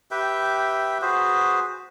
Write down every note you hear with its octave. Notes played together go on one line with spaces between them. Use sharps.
G4 B4 E5 G5
F#4 G#4 B4 C5